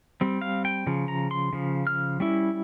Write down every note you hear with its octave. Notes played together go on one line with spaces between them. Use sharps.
G3 C4
F5
G5
C#3 F3
A#5
C6
C#3 F3
F6
G3 C#4 E4